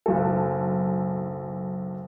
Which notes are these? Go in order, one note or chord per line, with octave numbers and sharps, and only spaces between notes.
F#1 B1 A4